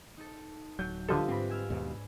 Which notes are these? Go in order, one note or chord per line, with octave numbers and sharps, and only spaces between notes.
D#4 A4
D1 F#3 G6
D3 F3 G3 F4 A4 B4 D#5 E5
G#2 C4 D4 B5
G#5 E6 F6
D#2 G#2 B2